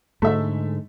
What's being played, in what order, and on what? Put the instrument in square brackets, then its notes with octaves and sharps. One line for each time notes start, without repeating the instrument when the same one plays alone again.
[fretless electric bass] G#2 D3 G#3 [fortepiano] A3 E5